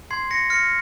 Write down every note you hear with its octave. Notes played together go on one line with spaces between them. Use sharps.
C6 G#6 C7
A#6 C#7
F6 A#6 C#7